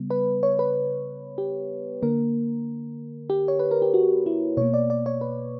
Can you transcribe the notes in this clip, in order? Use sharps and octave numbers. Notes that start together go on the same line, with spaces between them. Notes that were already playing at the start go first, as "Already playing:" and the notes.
Already playing: C#3 G3 B3
B4
C#5
B4
G4
D3 A#3 A#4
G4
C#5
B4
A#4
G4
F#4
E4
B2 A#3 C#5
D5
D5
C#5
B4